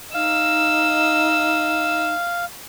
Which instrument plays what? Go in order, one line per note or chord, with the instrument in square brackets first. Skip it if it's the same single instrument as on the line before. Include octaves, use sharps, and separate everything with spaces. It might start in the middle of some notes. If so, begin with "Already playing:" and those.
[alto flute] D#4 [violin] D#5 E6 [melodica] F5